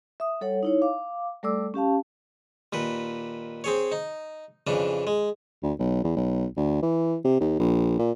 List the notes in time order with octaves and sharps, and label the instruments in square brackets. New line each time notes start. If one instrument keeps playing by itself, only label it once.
[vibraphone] E5 D#6
G3 A4 C#5 F#5
D#4 E4 C#5
F5 D6
G3 A3 A4 D5 D6 E6
C#4 G4 F5 A5
[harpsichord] D#2 A#2 B4
C4 G#4 C#5
D#4
F2 C#3 E3 D4
G#3
[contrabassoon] D2
B1
E2
B1
D2
E3
C3
D#2
A#1
A#2